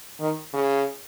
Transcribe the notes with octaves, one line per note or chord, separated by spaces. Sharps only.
D#3
C#3